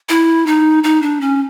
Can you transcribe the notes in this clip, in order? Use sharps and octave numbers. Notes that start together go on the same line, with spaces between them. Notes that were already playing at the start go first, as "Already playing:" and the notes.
E4
D#4
D#4
D4
C#4